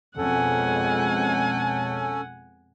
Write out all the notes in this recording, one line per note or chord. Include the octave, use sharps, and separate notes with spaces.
F2 B2 G#3 C#4 A4 F#5 G#5